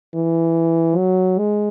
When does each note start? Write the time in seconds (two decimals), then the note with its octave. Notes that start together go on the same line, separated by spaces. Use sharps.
0.14 E3
0.97 F#3
1.38 G#3